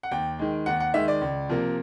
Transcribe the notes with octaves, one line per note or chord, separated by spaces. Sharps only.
F#5
D#2 G5
D#3 G#3
D#2 F#5
F#5
D#3 G#3 E5
D5
C#2
C3 F3 A#3